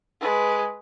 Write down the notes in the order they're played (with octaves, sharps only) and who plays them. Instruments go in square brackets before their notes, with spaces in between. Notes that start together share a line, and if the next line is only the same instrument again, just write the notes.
[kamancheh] G#3 B4